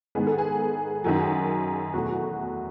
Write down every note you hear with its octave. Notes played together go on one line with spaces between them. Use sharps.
G#2 D#3 G#3 B3 G#4
A4
G#4
F#2 D#3 F#3
E2 B2 A3 F#4
F#4